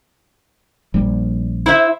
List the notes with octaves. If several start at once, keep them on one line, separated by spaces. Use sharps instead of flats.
A#1 G3
E4 C5 E5